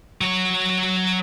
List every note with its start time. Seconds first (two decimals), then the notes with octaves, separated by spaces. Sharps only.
0.21 F#3 C#5